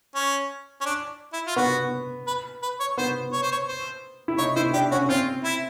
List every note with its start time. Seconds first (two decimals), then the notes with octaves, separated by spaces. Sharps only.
0.15 C#4
0.81 C#4
0.86 D4
1.33 E4
1.47 F4
1.56 B3 F#4
2.27 B4
2.63 B4
2.80 C#5
2.98 B3 C5
3.33 C#5
3.42 C5
3.52 C#5
3.68 C5
4.28 E4
4.38 D#4 C#5
4.56 E4 C5
4.73 D4 G4
4.92 C#4 F#4
5.09 C4 F4
5.44 E4